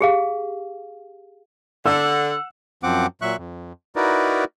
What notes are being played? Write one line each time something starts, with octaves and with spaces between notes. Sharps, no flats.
G4 G#4 F5
D3 F#5 E6
F#2 F3 C4 F#5 D6
A#2 F#3 E5 C#6 F#6
F2
D#4 E4 F#4 A#4 B4 D5